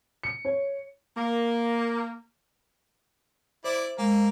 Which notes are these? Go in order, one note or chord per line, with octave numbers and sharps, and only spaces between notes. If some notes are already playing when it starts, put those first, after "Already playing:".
C#7
C#5
A#3
E4 C5 D5
G#3 A#3